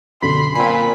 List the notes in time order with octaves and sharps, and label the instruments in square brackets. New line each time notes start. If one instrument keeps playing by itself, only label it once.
[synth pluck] F#2 B2 D3 [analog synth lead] B5 [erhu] C6
[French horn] A#2 [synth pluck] C4 C7 [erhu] G#5 [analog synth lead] B5